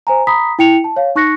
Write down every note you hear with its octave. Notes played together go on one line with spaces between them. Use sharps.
C5 G#5 A#5
A#5 B5 D#6 B6
E4 G5 C#7 F7
A5
C#5 F5
D#4 C#6 F#6 A#6 C#7